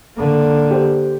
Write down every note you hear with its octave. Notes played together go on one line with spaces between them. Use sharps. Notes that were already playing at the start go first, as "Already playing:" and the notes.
D3 A#3
G4 C5